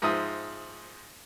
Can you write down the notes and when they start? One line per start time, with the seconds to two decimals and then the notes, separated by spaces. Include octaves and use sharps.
0.02 G#2 F3 E5 D#6